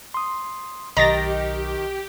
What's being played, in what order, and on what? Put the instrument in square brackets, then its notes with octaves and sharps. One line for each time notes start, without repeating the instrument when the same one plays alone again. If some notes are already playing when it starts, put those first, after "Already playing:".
[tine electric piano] C6 D#6
[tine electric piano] B1 D#5 [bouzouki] D#3 [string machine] G4 [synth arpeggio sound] A#5 A6 A#6